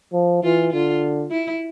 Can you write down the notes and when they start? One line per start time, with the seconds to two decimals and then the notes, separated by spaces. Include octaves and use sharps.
0.13 F3
0.43 E3 F4
0.73 D3 F4
1.31 E4